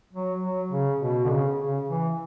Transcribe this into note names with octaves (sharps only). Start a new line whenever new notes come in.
F#3
F#3
C#3
B2
D3
C#3
C#3
E3